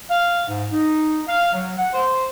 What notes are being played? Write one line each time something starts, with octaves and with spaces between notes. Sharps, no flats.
F5
G#2
D#4
F5
F#3
F#5
C5